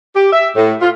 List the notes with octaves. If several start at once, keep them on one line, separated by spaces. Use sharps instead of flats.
G4
E5
A2
F4